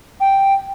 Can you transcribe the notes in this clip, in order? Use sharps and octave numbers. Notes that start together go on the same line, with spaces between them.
G5